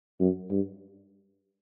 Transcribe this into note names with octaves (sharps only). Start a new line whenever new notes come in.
F#2
G2